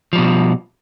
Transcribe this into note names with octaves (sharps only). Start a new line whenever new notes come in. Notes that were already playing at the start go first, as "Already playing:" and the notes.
B2 F3 G3